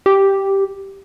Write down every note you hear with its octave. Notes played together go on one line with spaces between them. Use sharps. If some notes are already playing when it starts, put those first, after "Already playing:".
G4